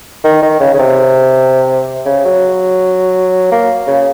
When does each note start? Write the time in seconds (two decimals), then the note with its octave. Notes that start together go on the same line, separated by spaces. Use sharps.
0.24 D#3
0.43 D#3
0.60 C#3
0.74 C#3
0.79 C3
2.06 C#3
2.25 F#3
3.52 A#3
3.87 C#3